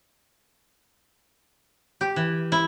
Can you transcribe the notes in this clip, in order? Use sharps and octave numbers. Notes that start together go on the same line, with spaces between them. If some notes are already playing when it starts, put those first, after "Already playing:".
G4
E3
E4